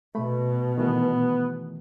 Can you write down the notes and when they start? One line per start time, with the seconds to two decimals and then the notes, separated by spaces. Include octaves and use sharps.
0.15 B2 A3 B5
0.78 D#3 E3 A3 B3